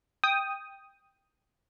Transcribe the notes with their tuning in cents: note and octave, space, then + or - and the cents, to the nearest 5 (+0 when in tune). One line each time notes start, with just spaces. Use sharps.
G5 +5 D#6 +0